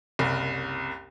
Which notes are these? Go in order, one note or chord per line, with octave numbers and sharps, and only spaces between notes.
F#1 C2